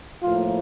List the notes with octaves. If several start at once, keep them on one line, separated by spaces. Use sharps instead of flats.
A2 F3 A#3 F4